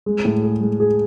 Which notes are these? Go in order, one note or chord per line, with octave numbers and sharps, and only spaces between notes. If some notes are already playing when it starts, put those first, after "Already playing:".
G#3
A2
G#4
G#3
G#4